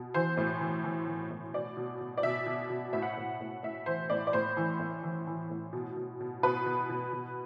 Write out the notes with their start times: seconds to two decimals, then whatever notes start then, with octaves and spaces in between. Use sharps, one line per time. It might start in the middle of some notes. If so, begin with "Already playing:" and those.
Already playing: B2
0.14 E3 C5
0.37 A2
0.61 E3
0.84 E3
1.07 E3
1.31 A2
1.53 B2 D5
1.77 B2
2.01 B2
2.18 D5
2.23 B2 E5
2.46 B2
2.70 B2
2.93 A2 E5
3.02 F#5
3.13 A2 E5
3.41 A2
3.63 A2 E5
3.86 E3 C5
4.10 A2 D5
4.27 D5
4.33 A2 C5
4.57 E3
4.80 A2
5.03 E3
5.27 E3
5.50 A2
5.73 B2
5.97 B2
6.20 B2
6.43 B2 B4
6.66 B2
6.90 B2
7.13 B2